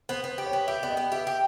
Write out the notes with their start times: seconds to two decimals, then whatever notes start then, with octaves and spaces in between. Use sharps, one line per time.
0.09 B3 C5
0.24 B3 C5
0.38 G4
0.46 C#5
0.53 B3
0.67 G4 E5
0.83 B3 D5
0.90 D#5
0.97 B3
1.12 G4 E5
1.27 G4